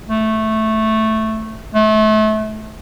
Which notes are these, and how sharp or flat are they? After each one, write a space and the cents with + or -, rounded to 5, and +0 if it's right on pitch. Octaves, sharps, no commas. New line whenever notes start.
A3 -5
A3 -30